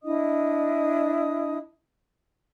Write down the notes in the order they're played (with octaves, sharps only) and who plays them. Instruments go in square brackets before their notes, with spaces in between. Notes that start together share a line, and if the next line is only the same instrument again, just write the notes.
[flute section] D4 E4 D#5 D#6